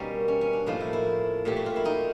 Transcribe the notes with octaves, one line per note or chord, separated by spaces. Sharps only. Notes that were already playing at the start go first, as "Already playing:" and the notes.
Already playing: B2 G3 A#3 C#4 D#4
C#4
C#4
D4
A2 F3 A#3 D#4
E4
E4
A#2 F#3 A3 G4
F#4
F4
E4
D#4